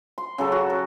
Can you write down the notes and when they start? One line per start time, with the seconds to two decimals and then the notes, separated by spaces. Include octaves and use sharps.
0.18 C6
0.38 C#3 F#3 A4
0.52 F#4
0.70 A#4